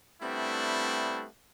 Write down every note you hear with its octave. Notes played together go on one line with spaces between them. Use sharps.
G3 A3 B3 C4 D4 E4